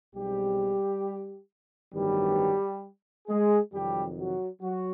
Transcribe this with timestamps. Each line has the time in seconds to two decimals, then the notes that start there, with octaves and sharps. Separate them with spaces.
0.15 B1 B2 G3 G#3 C4 G4
1.94 A1 G2 D#3 F#3 G3 B3 G4
3.28 G#3 G#4
3.72 F2 C3 D#3 F#3 G3 G4
4.17 F#3 F#4
4.62 F#3 F#4